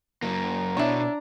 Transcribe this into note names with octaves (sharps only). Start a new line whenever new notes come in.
F#2 A#3 A#5
B2 D4 E4 C#5